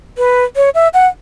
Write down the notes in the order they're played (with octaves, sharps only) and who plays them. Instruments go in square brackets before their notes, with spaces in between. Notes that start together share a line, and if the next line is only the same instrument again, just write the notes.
[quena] B4
C#5
E5
F#5